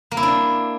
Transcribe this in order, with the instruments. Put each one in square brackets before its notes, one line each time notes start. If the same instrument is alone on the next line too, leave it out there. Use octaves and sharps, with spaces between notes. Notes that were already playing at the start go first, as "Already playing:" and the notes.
[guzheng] A#3
E4
D4